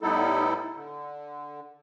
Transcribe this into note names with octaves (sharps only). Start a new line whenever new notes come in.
A2 G3 B3 D#4 E4 A4
D3